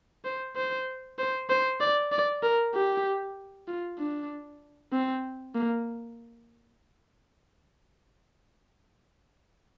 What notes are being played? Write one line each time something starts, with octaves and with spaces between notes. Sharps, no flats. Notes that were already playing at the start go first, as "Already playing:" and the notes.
C5
C5
C5
C5
D5
D5
A#4
G4
F4
D4
C4
A#3